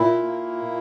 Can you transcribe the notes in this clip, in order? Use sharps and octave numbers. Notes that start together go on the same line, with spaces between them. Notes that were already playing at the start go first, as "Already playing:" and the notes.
Already playing: A#2 E4
A#3
A#2